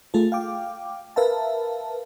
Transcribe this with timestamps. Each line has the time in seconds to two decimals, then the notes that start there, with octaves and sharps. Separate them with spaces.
0.14 A3 F4 G#4 A4
0.32 F5 G5 D6
1.16 A#4 B4 E5 F5 A5